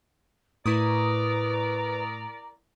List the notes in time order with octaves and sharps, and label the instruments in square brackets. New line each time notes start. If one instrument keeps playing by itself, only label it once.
[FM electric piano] A2 [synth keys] E4 C#6 D#6 [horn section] A#4 D5 A#5 [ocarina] B4